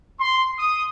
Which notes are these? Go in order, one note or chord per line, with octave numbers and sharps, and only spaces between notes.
C6
D#6